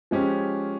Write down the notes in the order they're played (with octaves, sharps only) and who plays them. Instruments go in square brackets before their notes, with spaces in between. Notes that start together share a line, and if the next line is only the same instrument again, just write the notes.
[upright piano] F3 G#3 C#4 G4